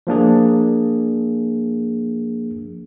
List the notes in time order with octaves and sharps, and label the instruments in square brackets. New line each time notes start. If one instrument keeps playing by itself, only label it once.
[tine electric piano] F3 A#3 D4 G#4